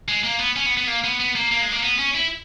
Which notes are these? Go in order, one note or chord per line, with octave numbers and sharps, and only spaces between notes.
G#3
A#3
B3
C#4
B3
B3
A#3
B3
B3
A#3
A#3
G#3
A#3
B3
C#4
E4